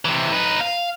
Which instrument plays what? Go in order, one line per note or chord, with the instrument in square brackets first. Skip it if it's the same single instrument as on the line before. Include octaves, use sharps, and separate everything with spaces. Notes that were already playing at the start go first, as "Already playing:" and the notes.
[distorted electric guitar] C3 E3
D#4 B4
F5